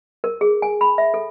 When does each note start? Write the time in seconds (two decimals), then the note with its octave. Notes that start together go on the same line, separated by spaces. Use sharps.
0.24 A#4
0.41 G#4
0.62 G#5
0.81 B5
0.98 E5
1.14 A4